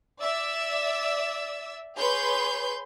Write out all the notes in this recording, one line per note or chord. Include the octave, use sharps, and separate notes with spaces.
D5 E5 E6
G#4 B4 C#5 C6 G6